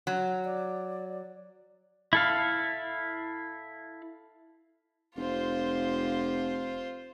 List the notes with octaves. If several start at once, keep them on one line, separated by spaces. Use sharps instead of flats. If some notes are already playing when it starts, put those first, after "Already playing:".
F#3
D5
E4 A4 F5
F1 F4 C5